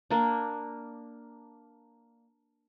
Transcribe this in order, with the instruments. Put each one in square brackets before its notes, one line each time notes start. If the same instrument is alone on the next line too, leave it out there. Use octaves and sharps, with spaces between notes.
[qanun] A#3 D4